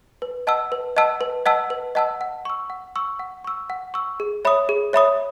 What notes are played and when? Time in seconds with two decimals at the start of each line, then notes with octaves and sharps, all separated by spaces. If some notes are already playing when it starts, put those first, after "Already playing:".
0.22 B4
0.47 D#5 F#5 A5 E6
0.72 B4
0.97 D#5 F#5 A5 E6
1.21 B4
1.46 D#5 F#5 A5 E6
1.70 B4
1.95 D#5 F#5 A5 E6
2.21 F#5
2.45 C#6 E6
2.70 F#5
2.96 C#6 E6
3.19 F#5
3.44 C#6 E6
3.70 F#5
3.94 C#6 E6
4.20 G#4
4.45 C#5 E5 B5 D#6
4.69 G#4
4.93 C#5 E5 B5 D#6